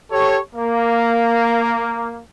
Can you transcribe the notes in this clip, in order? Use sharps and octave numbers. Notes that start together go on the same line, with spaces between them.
G4 A4 C#5
A#3